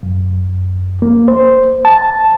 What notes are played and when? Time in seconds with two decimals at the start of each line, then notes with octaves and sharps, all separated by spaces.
0.03 F#2
1.02 A#3
1.28 C5
1.85 A5